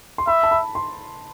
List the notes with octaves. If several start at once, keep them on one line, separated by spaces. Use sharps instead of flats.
C6
E5 B5
A5
B5
C6